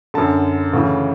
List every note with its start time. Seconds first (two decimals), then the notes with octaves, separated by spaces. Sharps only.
0.14 F#2 D3 A5
0.73 D2 C#3 E3